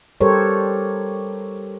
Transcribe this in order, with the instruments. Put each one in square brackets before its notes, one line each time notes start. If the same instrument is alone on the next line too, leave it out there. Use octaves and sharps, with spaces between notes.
[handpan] G3 G4 A4 A#4 C5 C#5